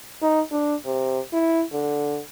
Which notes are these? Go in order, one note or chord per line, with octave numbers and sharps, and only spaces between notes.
D#4
D4
C3
E4
D3